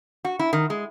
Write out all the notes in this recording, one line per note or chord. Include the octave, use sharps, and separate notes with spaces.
F#4
E4
D#3
G#3